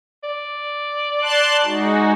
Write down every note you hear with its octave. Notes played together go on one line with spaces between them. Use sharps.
D5
A5 C6 F#6
G#3 D#4 F#4